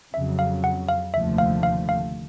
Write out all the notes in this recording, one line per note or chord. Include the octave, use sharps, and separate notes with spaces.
F2 C#3 F#3 E5
F5
F#5
F5
F1 D#2 D3 F3 A3 E5
F5
F5
F5